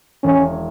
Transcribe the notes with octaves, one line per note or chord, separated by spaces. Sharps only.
E1 C#4